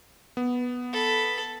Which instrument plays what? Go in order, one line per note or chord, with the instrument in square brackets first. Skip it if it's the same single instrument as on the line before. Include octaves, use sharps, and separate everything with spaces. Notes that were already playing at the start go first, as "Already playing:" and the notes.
[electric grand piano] B3
[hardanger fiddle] A4 B5